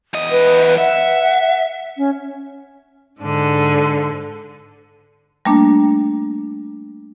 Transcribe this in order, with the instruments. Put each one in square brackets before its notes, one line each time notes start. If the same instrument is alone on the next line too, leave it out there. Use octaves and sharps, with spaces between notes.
[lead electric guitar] E2 D#5
[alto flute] B4
[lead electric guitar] E5 [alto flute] F#5
[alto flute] C#4
[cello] G#2 D3
[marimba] G3 A3 A#3 D4